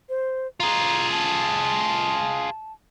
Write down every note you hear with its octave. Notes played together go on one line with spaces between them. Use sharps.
C5
F4 G#4 A#5
A5